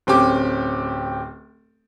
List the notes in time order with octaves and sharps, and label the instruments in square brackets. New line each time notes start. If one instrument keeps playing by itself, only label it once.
[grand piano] D1 C4 C#4 G4 D6